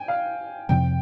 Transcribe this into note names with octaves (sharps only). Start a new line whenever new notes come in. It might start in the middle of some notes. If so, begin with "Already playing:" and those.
Already playing: G5 G#5
F5
F2 C3 F3 C4 G5